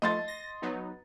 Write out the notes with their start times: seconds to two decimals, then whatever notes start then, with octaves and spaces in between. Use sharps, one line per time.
0.02 F3 A3 D#5 C6 A6
0.28 A#6
0.62 F#3 B3 D#4